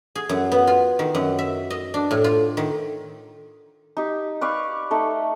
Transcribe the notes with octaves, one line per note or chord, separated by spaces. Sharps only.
G#4
F#2
B3
F4
D#3
F#2
E5
D#5
D4
A2
F4
D#3
D#4 G4
B4 D5 F5 C#6
A3 D#4 A4